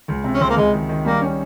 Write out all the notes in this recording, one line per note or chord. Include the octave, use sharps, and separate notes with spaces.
C#2
C3
C#4
C#2 C4
A#3
C#2 G#3
D#3
D#3
G3 A#3
C#4